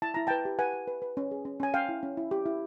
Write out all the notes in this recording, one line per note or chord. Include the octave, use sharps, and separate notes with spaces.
E4 A5
E4 A#5
B4 G5 A5
G4
B4 F#5 G#5
B4
B4
B4
C#4
G#4
C#4
C#4 G#5
C#4 F5 G5
E4
C#4
E4
G4
E4